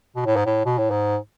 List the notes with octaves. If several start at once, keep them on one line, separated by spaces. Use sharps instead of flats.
B2
A2
G#2
A2
B2
A2
G#2